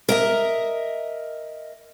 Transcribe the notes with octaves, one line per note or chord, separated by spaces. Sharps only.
A#4 D#5 E5